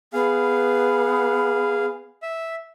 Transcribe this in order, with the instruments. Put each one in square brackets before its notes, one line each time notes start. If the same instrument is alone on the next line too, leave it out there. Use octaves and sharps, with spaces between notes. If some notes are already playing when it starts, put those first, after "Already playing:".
[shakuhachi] B3 [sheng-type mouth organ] G#4 F5
[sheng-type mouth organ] E5